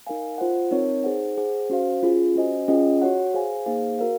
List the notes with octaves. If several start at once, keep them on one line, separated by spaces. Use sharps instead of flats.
D#4 A#4 F5 G#5
F4 C5 F#5
C4 D#4 A#4 C#5
D#4 G#4 C5 F#5
G#4 C5 F#5
C#4 F#4 C5 F5
C#4 F4 G#4
C#4 F#4 C5 D#5 G#5
C#4 F4 G#4 D#5 F#5
F#4 C#5 F#5
G#4 C5 F5 G#5
A#3 D#4 G#4 C5 F5
F#4 A#4 F5